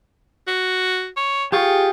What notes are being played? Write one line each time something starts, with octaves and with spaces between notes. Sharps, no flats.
F#4
C#5
F4 G4 G#4 C#6